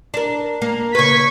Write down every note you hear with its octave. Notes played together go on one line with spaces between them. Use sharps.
D4 A#4
A#3
C#3 B4 C#6 G#6 B6